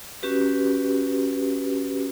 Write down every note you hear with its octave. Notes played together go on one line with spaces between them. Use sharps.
C#4 F#4 G4 B4